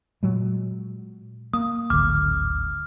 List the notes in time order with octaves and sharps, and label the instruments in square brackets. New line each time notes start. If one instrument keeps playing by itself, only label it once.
[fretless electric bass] A#2 F#3 G#3
[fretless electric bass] A#3 [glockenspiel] D#6
[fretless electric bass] D1 G#1 D3 [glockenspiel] D6 F6